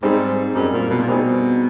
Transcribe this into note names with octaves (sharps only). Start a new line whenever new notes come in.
G#2 G3 C4 D#4 G#4
F#2 G3 C4 D#4 G#4
A#2
B2
A#2
B2 G3 C4 D#4 G#4